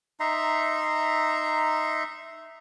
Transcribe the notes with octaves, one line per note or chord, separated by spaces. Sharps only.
D#4 E5 A#5 C6